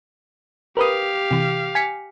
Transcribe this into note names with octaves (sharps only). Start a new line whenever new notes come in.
G4 A#4 B4 F5 D#6
C3 E3
G#5 B6 C#7